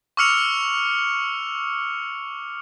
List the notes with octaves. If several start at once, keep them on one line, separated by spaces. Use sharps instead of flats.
C#6 D6 E6 F6 C#7 F7